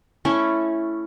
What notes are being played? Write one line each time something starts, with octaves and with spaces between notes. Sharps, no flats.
A3 C#4 E4